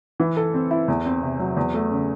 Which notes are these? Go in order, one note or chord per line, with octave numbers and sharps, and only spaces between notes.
E3
A4
C4
E4
E2
C4
C3
F#3
E2
A3
C#3